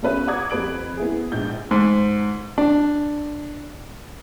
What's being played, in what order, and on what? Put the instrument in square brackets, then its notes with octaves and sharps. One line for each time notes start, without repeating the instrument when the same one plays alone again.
[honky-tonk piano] B1 B2 C#4 B4 E5
D5 F#5 A#5 D6 D#6 G#6
F2 G4 B4 D7 F#7
B3 E4 G#4
A#1 G#2 G6
[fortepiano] G#2
D4